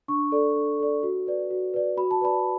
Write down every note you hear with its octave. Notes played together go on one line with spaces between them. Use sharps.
D4 C#6
A4 D5
D4
A4 D5
F#4
B4 D5
F#4
B4 D5
F#4 B5
A5
B4 D5 B5